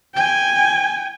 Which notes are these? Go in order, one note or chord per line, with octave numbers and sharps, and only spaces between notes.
G5 G#5